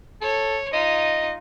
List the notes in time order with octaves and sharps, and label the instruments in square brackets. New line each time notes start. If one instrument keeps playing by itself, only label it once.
[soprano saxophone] A4 [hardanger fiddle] C#5
[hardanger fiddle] D#4 F4 [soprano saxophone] D#5